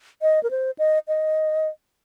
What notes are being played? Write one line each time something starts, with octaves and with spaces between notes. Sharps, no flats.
D#5
A#4
C5
D#5
D#5